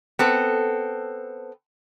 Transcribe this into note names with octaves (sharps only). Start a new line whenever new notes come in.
B3 C4 A4